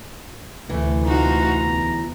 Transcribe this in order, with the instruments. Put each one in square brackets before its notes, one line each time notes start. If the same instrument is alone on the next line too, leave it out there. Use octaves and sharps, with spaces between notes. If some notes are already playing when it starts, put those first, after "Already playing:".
[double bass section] D2 C3 [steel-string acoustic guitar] E3 A3
[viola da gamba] D#4 F4 F#4 [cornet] A#5
[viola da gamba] E2